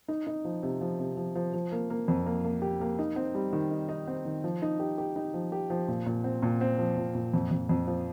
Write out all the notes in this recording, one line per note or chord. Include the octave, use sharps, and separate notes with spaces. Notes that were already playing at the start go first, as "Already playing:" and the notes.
D#4
D#4
F3
C3
F3
C3
F3
F3
F3
A#3
A#3
F2
A#3
A#3
G4
A#3
D#4
C4
G3
D#3
D#4
D#4
C4
D#3
F3
D#4
G4
G4
D#4
F3
G4
F3
A#2
A#2
C4
A#2
C4
F3
A#2
A#2
F2
F2
F2
F3